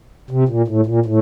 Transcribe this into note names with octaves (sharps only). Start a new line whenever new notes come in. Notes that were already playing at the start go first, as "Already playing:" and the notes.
C3
A#2
A2
A#2
A2